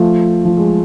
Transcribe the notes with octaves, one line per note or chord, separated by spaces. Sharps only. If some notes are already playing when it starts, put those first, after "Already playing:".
Already playing: F3 A3
F3
G#3